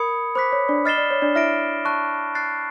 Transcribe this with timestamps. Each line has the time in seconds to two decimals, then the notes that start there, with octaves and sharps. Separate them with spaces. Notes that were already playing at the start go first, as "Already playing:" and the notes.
Already playing: A#4 B5 D#6 G#6 C#7
0.35 C5 B5 D6 F#6 B6
0.52 C#5
0.69 D4 D5
0.85 D#5 F6 A6 C7 E7 G7
0.98 D5
1.11 C#5
1.22 D4 D5
1.35 E4 E5 F6 A#6 D7
1.85 A5 C#6 F#6
2.35 F#6 A6 C7